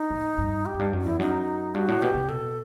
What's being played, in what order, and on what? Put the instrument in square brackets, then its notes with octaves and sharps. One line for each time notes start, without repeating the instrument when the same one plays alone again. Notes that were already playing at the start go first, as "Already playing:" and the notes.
Already playing: [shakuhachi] D#4
[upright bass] A2
G2
[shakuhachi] G4
[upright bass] F#2
G2
F#2
[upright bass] E2 [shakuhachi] E4
[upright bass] F#2 [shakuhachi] D#4
[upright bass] G2 [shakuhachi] F#4
[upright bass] A2
[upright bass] B2 [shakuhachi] G4
[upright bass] C3
[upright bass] B2 [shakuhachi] A4